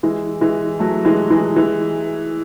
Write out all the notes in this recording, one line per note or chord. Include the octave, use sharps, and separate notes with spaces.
E3 G#3
E3 G#3
F#3 A3
E3 G#3
E3 G#3
E3 G#3